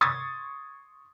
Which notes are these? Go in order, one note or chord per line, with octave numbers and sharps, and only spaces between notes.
C6 C#6 D#6 G#6 A6